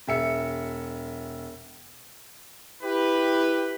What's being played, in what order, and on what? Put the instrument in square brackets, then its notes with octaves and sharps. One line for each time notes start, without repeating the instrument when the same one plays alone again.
[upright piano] E1 E5 C#7
[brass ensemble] E4 G4 B4